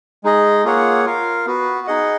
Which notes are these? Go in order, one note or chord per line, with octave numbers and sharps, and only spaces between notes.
G#3 D#4 G#4 D#5
A#3 F4 G#4 C#5 F#5
F4 A#4 F5
B3 F#4 B4
D#4 G#4 D#5 F#5